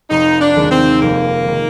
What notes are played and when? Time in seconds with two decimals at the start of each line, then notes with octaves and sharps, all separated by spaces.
0.10 F1 D#4
0.41 D4
0.57 D#2 D#3 G#3
0.71 C4
1.02 F1 A#3
1.48 D#3 G#3